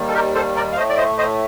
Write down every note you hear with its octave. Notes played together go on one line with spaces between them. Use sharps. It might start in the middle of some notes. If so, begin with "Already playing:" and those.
Already playing: D#2 D#3 G3
A4
G4 A#4
A4 C5
A#4 D5
F5
A2 A3 C5 D#5
D5
C5 D#5
C5 D#5